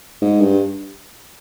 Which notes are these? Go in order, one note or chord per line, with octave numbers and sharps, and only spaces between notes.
G#2
G2